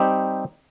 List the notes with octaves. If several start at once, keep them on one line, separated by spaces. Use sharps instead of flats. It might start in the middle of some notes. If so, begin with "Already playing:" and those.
Already playing: G3 C4 D#4 G4